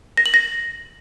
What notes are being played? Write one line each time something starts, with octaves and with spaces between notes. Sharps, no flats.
A#6
F#7
A#6